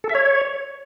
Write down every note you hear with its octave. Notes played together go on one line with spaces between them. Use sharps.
A4
E5
C#5